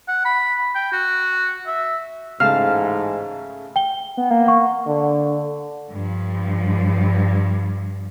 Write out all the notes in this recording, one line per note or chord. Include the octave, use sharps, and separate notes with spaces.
F#5
B5
G5
F#4
E5
A1 G#2 C#3 A3 F5 A5 F6
G5 G7
B3
A#3
F#5 C#6
D3
G2 F3